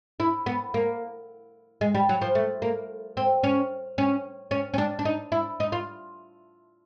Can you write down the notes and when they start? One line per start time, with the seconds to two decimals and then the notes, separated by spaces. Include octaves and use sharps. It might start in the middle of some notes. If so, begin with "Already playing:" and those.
0.20 E4
0.46 B3
0.74 A#3
1.81 G#3
1.95 G3
2.09 F#3
2.21 F3
2.35 A3
2.62 A#3
3.17 C4
3.44 C#4
3.98 C#4
4.51 C#4
4.74 C#4
4.78 D4
4.99 D4
5.05 D#4
5.32 E4
5.60 D#4
5.72 F4